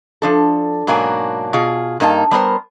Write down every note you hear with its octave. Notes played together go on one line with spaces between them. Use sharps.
F3 D4 A4
G#2 B2 F#3 A#3 D4 G#5
B2 F4 G#4
G2 A#3 D#4 F#4 A5
G3 B3 A#4 C5